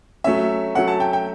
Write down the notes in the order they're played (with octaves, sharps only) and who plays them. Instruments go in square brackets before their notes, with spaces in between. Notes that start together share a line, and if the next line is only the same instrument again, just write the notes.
[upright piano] F#3 A3 C#4 [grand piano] E5
[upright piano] F#3 A3 C#4 [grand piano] F#5
[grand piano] A5
G5
G5